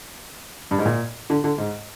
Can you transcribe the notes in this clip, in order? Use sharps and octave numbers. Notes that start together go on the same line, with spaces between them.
G2
G#2
A#2
D3
D3
G#2